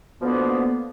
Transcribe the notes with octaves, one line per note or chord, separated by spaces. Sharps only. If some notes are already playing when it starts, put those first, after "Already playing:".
B2 D3 F3 A#3 B3